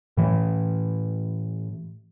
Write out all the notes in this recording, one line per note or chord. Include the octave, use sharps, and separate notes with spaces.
A2 E3